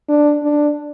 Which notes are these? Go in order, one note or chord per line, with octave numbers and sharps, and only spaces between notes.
D4
D4